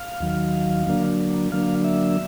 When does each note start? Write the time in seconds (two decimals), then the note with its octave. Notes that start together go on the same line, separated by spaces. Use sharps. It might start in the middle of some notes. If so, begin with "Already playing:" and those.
Already playing: F5
0.20 D#2 D#3 F#3
0.87 D3 F#3 A#3 D4
1.52 D3 F#3 A#3 D4 F5
1.84 E5